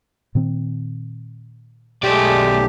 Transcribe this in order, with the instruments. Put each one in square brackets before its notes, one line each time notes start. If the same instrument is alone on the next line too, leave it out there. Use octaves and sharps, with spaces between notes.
[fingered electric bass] A#2 D#3 C4
[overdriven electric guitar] B1 D5 [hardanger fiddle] G#3 A3 [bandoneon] G4